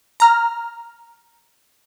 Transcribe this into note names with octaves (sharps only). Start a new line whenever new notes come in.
A#5 F6